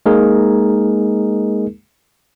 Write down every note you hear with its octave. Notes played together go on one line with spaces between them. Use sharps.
G#3 A#3 D#4 G#4 A#4